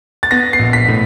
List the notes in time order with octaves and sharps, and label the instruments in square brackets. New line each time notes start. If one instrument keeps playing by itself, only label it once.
[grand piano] A6
B3 A#6
C7
A#1
B6
A2